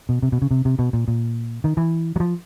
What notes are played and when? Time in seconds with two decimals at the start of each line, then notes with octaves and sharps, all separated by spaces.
0.09 B2
0.22 C3
0.32 B2
0.42 C#3
0.51 C3
0.65 C3
0.79 B2
0.93 A#2
1.08 A#2
1.64 D#3
1.77 E3
2.16 F#3
2.20 F3